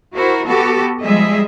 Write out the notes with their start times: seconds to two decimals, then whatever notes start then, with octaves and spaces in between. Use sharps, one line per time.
0.13 E4 F#4 A#4 C5
0.46 B3 F#4 G4 A4
1.01 F3 G3 G#3 G#4 D#5 E5